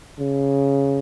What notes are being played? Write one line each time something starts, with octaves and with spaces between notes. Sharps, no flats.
C#3